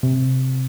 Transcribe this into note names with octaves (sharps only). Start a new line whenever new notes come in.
C3